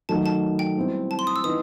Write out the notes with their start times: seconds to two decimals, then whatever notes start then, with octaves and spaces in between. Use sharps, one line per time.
0.09 D#3 F#3 A3 A5
0.26 A5
0.59 G5
0.77 B2 G3 C4 E4
1.11 A5
1.19 C6
1.27 D#6
1.36 E6
1.44 E3 B3 D#4 D#6